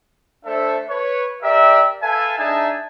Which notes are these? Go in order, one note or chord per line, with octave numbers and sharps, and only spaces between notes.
A3 D4 A4 C5 E5
B4 C#5
G4 A#4 D5 E5
A4 B4 E5 F5 G#5 A5
D4 D#4 G#4 E5 G#5 A5